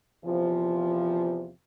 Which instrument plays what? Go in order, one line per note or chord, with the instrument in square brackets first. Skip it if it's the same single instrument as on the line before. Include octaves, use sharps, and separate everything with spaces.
[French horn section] E2 C3 F3